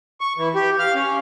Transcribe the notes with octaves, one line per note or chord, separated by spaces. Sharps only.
C#6
E3
G4
F5
C#4